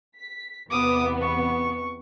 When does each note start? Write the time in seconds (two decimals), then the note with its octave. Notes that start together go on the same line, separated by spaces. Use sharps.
0.16 B6
0.71 E2 C3 B3 D6 D#6
1.21 C#6